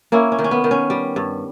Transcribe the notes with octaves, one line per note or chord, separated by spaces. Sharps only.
A#3 C#4 E4
C#4
D#3
C#4
B3
D#3
C#4
G3
G2